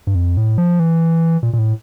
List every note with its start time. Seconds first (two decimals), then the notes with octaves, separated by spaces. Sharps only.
0.07 G2
0.15 F2
0.37 A2
0.58 F3
0.80 E3
1.43 A#2
1.53 A#2
1.59 A2